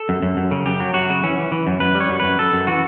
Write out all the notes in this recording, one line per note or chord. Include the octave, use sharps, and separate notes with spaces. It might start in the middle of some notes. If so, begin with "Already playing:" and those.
Already playing: A4
F#2
F#2
F#2
C#3
F#2 G4
F#3
F#2 F#4
C#3
E3 C#4
E3
E3
F#2
F#2 B4
G3
C#5
F#2
F#2 B4
F#2 A4
F#2
E3 F#4